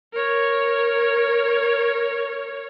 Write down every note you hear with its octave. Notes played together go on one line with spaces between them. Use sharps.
A#4 C#5